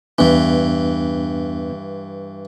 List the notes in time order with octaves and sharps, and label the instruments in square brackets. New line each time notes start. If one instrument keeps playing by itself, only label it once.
[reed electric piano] E2 B3 D4 [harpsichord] G2 E3